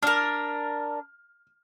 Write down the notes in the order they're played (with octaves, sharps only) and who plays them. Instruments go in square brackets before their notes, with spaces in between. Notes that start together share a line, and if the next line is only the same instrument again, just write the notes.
[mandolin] D4 A#4 [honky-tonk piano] F6